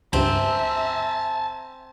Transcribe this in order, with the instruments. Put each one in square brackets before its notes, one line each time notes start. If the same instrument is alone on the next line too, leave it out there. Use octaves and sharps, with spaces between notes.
[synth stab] C#2 G2 [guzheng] C4 [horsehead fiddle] E5 [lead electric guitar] G#5 A5